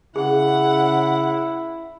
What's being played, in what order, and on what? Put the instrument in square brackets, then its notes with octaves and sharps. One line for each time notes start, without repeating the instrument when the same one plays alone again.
[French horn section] C#3 [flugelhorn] E4 [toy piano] G#4 [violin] F#5